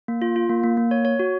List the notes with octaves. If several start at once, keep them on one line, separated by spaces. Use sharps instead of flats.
A#3
F4
F4
A#3
A#3
A#3
C#5
C#5
F#4